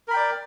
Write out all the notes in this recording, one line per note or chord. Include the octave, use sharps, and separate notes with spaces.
A#4 D5 G5 B5